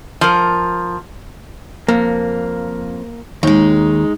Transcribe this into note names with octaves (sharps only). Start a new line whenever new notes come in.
F3 A#4
F2 A#3
D#2 G#3 D#4